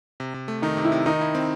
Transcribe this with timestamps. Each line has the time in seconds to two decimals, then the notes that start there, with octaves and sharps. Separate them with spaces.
0.20 C3
0.34 C3
0.48 A3
0.62 D#3 D#4
0.77 C3
0.85 E4
0.92 C3
1.06 D#3 D#4
1.21 E4
1.35 C4